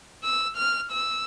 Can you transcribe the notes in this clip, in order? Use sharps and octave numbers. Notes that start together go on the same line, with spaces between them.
E6
F6
E6